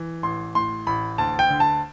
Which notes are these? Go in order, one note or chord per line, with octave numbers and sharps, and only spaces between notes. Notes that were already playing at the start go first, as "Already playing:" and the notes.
Already playing: E3
A1 C6
A2 C6
A1 B5
D2 A5
G5
D3
A5